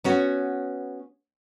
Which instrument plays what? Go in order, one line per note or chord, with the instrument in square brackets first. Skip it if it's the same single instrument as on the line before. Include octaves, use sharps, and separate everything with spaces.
[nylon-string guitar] B3 C#4 F#4